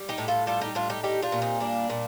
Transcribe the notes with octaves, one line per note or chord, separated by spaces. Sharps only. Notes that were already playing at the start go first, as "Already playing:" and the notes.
Already playing: G3
D#4 G4
A2
F4 A4
G3 F4 A4
D#4 G4
A2 D4 F4
D#4 G4
G3 D#4 G4
D4 F4
A#2
C4 D#4
G3 A#3 D4
A#2